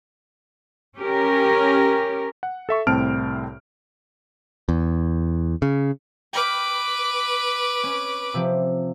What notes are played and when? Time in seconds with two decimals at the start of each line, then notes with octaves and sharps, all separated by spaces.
0.97 C#4 G4 A#4
2.43 F#5
2.69 A4 E5 C#6
2.87 C2 A2 C4 A5 F6 D7
4.69 E2
5.62 C#3
6.33 B4 G5 B5 D6 F6
7.84 C#4
8.34 C3 F3